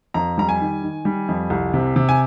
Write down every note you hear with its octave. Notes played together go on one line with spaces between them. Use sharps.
F2 A#5
G3 A#5
G#5
D#3
D#3
G3
F2
C2
C3
C3
G#5